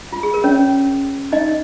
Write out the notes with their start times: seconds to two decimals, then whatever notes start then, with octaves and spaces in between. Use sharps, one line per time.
0.12 F4
0.23 G#4
0.34 A#4
0.44 C#4 C#5
1.32 D#4 D#5